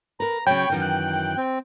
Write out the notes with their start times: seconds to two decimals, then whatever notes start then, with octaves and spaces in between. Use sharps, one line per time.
0.20 A#4 B4 A#5
0.47 C#3 F#3 C#5 G5 B5 C#6
0.70 F#2 D#3 E3
0.82 F#6
1.37 C4